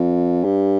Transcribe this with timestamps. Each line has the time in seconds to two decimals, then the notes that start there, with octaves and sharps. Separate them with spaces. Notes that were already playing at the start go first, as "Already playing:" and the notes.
Already playing: F2
0.44 G2